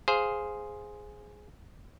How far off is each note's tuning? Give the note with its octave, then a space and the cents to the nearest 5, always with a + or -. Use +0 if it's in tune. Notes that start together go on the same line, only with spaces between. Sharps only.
G#4 +0 C5 +0 F5 +0